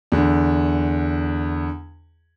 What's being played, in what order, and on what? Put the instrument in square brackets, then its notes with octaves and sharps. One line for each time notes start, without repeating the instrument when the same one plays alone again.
[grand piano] E2 D3